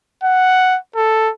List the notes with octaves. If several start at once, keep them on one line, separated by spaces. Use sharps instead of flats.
F#5
A4